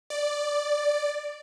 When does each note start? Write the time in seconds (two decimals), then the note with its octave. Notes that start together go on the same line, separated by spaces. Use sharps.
0.10 D5